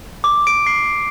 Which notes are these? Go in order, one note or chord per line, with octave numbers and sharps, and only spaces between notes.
D6
D7
C7